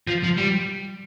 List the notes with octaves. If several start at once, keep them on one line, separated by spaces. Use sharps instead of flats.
F3
F3
G3